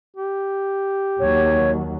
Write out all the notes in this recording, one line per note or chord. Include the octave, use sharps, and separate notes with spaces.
G4
D#2 F#3 C#5